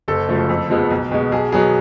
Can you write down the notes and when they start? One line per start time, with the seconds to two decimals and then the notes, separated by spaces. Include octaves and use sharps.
0.08 F#1 A4
0.29 F#2 C#3 F3 A3
0.49 F2
0.70 F3 G#3 B3
0.91 B1
1.12 B2 G#3
1.32 B1 G#4
1.52 B2 F#3 B3 G#4